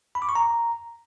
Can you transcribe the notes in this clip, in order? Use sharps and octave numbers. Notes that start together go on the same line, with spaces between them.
B5
D6
C#6
A#5